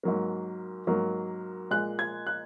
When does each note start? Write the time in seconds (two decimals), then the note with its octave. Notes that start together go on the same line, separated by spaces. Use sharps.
0.03 G#2 F#3 A#3
0.87 G#2 F#3 A#3
1.71 A#2 G#3 F#6
1.99 G#6
2.27 F#6